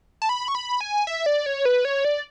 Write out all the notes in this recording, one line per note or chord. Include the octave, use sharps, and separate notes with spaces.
A5
B5
C#6
B5
G#5
E5
D5
C#5
B4
C#5
D5